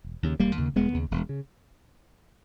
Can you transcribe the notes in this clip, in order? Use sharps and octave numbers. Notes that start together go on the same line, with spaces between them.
E1
D#2 C#3
E1 G3 A#3
D#2 C#3
E1 G#3 B3
D#2 C#3
E1
C#3